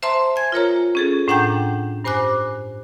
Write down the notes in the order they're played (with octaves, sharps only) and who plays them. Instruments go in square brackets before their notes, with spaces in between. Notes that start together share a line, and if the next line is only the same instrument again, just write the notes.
[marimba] C5 E5 A5 A#5 C6
G#5 G#6
F4 A#4 C#5 A#5
C#4 G#4 A4
A2 D4 F#5 G5 A#5 G6
G2 C5 G#5 D6 F#6